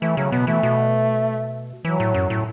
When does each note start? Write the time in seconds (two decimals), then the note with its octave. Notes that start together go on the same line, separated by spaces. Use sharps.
0.02 E3 A3
0.17 C#3 F#3
0.32 B2 B3
0.47 E3 A3
0.63 B2
1.85 E3 F#3
2.00 A2
2.14 F#2
2.30 A2